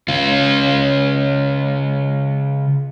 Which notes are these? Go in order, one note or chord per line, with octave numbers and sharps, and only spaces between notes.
C#3 F4